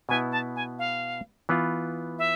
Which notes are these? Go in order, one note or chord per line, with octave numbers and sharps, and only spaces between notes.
B2 B3 E4 G#5
A5
G#5
F5
E3 B3 F4
E5